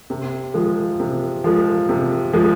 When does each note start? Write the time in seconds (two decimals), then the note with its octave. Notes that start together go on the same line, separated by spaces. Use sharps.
0.10 C3
0.54 F3 G#3
1.00 C3
1.44 F3 G#3
1.89 C3
2.33 F3 G#3